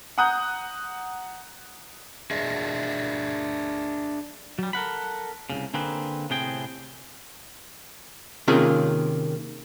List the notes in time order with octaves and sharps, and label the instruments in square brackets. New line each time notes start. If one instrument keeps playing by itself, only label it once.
[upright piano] F#5 A#5 D#6 F#6 G6
[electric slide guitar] D4 G#4 D#5 E5
[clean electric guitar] F#3 G3
A4 A#4 F#5 B5
C2 A#2 C#3
D3 A#3 C4 G#4 B4
A2 C3 B3 C4 G#4 G5
[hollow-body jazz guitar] C3 D#3 A#3 C#4 F4 G#4